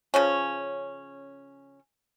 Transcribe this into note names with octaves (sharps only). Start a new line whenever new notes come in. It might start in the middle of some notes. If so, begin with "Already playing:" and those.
C#3 F3 C#4